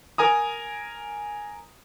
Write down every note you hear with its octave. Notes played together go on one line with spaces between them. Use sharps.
A#4 G#5 A#5 D#6